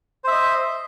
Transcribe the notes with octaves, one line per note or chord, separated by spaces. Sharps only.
C5 D#5 E5